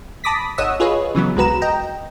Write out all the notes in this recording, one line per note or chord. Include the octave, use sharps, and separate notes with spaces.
A5 B5 D6 D#6 A#6 B6
G#1 C#5 D#5 F#5 D#6 E6
F4 G#4 B4 C#5 D#5
C#3 E3 F#3 B3
C2 G#3 F#4 B4 A#5 E7
D#5 G5 A#5